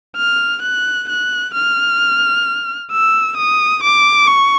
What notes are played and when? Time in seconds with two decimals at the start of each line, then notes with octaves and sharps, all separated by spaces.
0.17 F6
0.62 F#6
1.09 F#6
1.54 F6
2.92 E6
3.37 D#6
3.83 D6
4.28 C#6